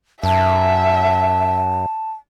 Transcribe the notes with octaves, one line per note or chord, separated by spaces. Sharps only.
F#2 E5 A5